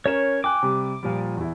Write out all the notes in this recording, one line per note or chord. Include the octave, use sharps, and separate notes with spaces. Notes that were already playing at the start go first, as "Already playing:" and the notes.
C#4 A#4 C#5 E7
G5 G#5 D6 F#6
C3 G3
A#2 F3 G3
E2 E4